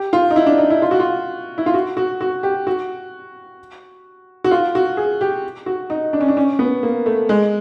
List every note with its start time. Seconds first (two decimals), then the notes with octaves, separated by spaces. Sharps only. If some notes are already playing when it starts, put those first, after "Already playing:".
Already playing: G4
0.13 F4
0.30 D#4
0.36 E4
0.46 D4
0.58 D#4
0.70 E4
0.82 F4
0.91 F#4
1.00 F4
1.58 E4
1.66 F4
1.74 F#4
1.97 F#4
2.21 F#4
2.43 G4
2.67 F#4
4.44 F#4
4.51 F4
4.75 F#4
4.97 G#4
5.21 G4
5.66 F#4
5.90 D#4
6.13 D4
6.21 C#4
6.28 D4
6.37 C#4
6.59 B3
6.83 A#3
7.06 A3
7.29 G#3